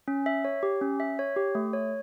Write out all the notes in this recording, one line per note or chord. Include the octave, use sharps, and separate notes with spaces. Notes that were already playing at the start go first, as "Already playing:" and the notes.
C#4
E5
C#5
G4
C#4
E5
C#5
G4
A3
C#5